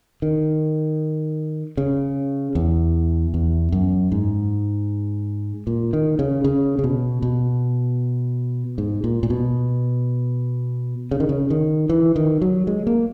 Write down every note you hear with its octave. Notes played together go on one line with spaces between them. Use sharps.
D#3
C#3
E2
E2
F#2
G#2
A#2
D#3
C#3
C#3
C#3
B2
B2
G#2
A#2
A#2
B2
C#3
D#3
C#3
D#3
E3
D#3
F#3
G#3
A#3